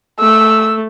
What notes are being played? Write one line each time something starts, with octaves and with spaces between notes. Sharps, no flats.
A3 E6